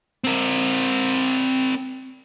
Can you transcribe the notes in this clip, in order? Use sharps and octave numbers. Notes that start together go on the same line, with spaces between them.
C4 A#4